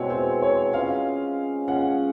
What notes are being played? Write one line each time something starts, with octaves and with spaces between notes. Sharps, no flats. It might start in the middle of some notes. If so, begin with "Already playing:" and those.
Already playing: B2 G#3 C4 E4 C#5
C5
C#5
G#3 C#4 F4 G#4 F5
G#3 C#4 F4 G#4 F#5